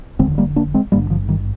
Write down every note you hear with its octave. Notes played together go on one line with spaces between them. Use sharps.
F1 D#2 D3 G#3 C4
G3 A#3
A#3 D4
G#3 C4
G#1 G2 D3 G3 A#3
D3 F3
D#3 G3